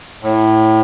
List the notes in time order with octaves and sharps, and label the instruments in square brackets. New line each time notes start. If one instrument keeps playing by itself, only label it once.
[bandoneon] A2